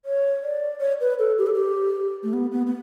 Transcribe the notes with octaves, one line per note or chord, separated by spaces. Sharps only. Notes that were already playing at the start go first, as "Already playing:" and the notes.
C#5
D5
C#5
B4
A4
G4
A4
G4
A3
B3
B3
B3